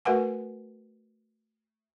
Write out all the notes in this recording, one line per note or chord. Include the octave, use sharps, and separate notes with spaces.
A3 F#4 A#4 B4 F#5 G#5